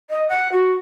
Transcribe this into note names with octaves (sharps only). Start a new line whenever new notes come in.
D#5
F#5
F#4